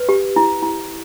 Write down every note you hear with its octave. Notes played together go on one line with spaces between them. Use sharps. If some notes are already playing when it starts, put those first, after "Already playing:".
Already playing: B4
G4
E4
E4